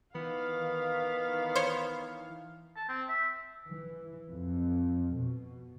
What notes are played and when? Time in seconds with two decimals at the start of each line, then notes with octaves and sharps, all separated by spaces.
0.15 D#3 E3 B3 F5
1.55 C5 C#5
2.76 A5
2.89 C4
3.08 E5
3.68 E3
4.30 F2
5.18 B2